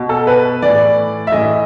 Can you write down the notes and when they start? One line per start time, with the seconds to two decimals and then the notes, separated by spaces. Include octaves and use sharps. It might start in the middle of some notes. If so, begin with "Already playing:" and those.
Already playing: B2
0.09 A4
0.27 B4
0.62 A2 E3 D5
1.27 E5
1.31 A2 E3 D#5